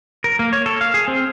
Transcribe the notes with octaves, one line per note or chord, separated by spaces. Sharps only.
A#4
A#3
C#5
A4
F5
G#4
C4